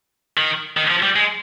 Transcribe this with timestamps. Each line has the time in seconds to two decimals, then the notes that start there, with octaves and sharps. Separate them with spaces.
0.38 D#3
0.77 D#3
0.90 F3
1.03 G3
1.16 G#3